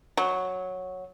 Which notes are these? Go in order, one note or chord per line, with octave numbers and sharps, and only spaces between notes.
F#3